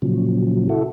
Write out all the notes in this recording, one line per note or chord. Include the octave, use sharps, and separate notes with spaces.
A#2 C#3 F3 F#3
E4 F#4 A4